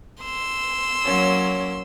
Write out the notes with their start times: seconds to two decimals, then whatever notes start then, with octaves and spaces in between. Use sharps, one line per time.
0.22 C6 E6
1.04 F#3 A#3 C#4